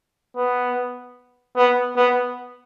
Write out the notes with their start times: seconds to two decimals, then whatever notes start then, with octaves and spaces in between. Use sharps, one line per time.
0.36 B3
1.57 B3
1.96 B3